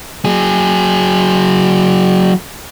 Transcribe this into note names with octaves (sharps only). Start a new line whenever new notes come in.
F#3 G#4